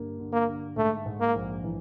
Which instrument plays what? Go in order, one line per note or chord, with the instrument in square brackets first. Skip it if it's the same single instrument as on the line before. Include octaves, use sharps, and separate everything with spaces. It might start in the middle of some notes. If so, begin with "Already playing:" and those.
Already playing: [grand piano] G2 D3 A#3
D3
[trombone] A#3
[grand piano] D3
[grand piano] G#2 [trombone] A3
[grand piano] G#2
[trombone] A#3
[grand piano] A#1
E3